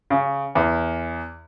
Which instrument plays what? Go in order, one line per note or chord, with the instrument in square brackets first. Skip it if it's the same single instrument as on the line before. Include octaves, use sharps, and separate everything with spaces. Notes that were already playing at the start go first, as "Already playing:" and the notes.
[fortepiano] C#3
E2